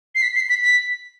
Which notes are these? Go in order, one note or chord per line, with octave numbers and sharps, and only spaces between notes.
C7
B6
C7
B6
B6